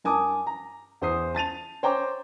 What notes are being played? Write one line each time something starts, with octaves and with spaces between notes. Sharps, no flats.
G2 A#4 G#5 A5 D6 D#6
A#5
E2 C5 D#6 C7
A5 A6 D#7 F7
C5 C#5 G5 A#5 D6